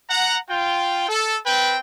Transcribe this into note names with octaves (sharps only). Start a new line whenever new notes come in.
F#5 A#5
F4 G5
A4
C4 B4 G5